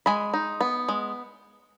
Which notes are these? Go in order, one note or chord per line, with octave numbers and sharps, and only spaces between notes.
G#3 G#5 B5
D#4
B3
G#3